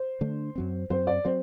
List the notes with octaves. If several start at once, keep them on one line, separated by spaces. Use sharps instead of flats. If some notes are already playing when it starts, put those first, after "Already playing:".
Already playing: C5
D3 A3 D4
F#2 F#3 C4
F#2 F#3 C4 C5
D5
F#3 C4 C5